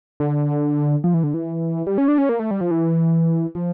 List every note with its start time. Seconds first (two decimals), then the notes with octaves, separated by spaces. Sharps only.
0.20 D3
1.04 F3
1.14 E3
1.24 D3
1.34 E3
1.87 G3
1.98 C#4
2.08 D4
2.18 C#4
2.29 A#3
2.39 A3
2.51 G3
2.61 F3
2.71 E3
3.55 F3